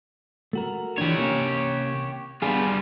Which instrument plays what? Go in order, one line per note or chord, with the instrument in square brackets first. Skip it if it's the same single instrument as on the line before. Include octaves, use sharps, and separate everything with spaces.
[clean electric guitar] A3 F#4 A#4
[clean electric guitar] E3 F3 D4 [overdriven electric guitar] G4 C#5
[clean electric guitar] C3 A#3 C#4
[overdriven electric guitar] G3 F4 [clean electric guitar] B3 D4 G#4